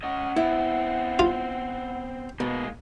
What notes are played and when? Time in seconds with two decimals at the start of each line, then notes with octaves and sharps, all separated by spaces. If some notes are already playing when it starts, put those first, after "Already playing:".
0.03 C#4 D#5 F#5
0.36 B3 C4 E4
1.19 F4
2.40 B2 G#3 A#3 D#4